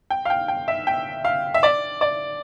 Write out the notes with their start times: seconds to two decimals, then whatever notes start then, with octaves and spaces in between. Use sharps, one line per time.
0.10 G5
0.25 F5
0.30 G5
0.48 G5
0.68 E5
0.87 G5
1.25 F5
1.54 E5
1.63 D5
2.01 D5